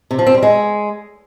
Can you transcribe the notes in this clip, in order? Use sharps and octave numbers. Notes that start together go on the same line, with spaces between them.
C3
F3
C4
G3
G#3